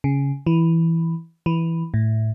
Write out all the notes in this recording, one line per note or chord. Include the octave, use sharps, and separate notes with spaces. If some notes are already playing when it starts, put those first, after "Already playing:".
C#3
E3
E3
A2